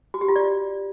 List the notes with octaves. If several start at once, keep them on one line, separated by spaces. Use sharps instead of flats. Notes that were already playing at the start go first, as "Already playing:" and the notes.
F#4
G4
F4
D5